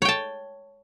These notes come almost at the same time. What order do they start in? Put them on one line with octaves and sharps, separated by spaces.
C#5 G5 A5